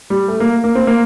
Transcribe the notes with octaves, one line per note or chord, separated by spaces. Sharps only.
G3
A3
A#3
A#3
C4
A#3